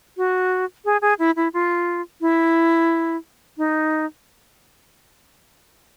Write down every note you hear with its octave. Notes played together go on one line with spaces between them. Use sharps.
F#4
G#4
G#4
E4
E4
F4
E4
D#4